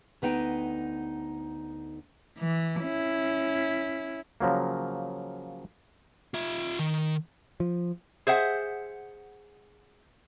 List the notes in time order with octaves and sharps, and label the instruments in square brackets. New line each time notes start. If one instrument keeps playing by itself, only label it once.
[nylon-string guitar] D2 B3 D#4 G5
[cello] E3
C#4 E4
[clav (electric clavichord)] C#3 F3 F#3 A#3
[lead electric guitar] F4 E5
D#3
[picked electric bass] F3
[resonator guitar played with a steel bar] G#4 C5 E5 F#5